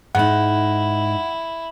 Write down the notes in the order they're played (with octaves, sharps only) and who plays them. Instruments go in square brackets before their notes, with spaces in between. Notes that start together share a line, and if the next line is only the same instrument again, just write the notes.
[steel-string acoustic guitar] G#2 D#4 [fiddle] E4 [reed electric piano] F#5